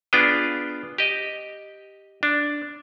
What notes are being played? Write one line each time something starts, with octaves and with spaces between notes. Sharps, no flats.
B3 D4 F4 G#4 G5
G4 D#5
D4